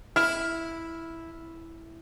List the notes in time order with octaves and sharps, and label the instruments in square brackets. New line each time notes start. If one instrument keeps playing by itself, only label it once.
[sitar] E4 [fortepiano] F6